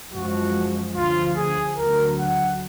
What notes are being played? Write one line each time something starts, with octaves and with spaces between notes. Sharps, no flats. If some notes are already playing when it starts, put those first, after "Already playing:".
F#2 F3 G#3 F#4
D2 D3 F3 F4
G#4
D2 D3 F#3 A#4
F#5